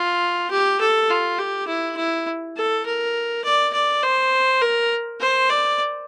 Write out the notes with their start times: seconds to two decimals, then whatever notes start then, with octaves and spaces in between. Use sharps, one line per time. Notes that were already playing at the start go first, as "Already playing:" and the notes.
Already playing: F4
0.50 G4
0.80 A4
1.10 F4
1.39 G4
1.67 E4
1.97 E4
2.56 A4
2.86 A#4
3.44 D5
3.73 D5
4.03 C5
4.61 A#4
5.20 C5
5.49 D5